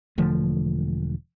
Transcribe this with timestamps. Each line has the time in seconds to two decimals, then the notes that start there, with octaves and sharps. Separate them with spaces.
0.18 E1 D3 F3 A3